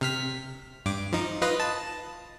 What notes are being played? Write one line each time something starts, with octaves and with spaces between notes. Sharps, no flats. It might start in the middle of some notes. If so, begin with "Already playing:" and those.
C3 F6 B6
G2 D6
F3 D#4
F4 B4 D#5
A5